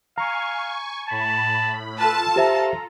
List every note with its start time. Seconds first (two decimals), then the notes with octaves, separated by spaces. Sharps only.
0.18 F5 G#5 A#5 C#6
1.08 A2 A5 B5
1.99 F4 A4 B4 A5
2.36 G4 C5 E5 A#5